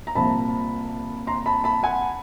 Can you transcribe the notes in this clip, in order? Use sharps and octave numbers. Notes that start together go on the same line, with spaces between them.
A#5
C2 A#2 F3 A5 B5
A#5 C6
A5 B5
A5 B5
F#5 G#5